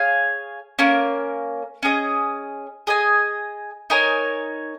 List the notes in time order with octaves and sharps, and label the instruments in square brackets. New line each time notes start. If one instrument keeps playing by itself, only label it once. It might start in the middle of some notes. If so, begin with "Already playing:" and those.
Already playing: [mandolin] G#4 C#5 F5 G#5
A#3 C#4 A#4
C#4 G#4 D#5
G#4 D#5 G#5
D#4 A#4 C#5 G#5